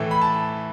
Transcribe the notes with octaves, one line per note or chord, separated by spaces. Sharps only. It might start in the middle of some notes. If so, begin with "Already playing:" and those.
Already playing: A2 E3 A3
B5
A5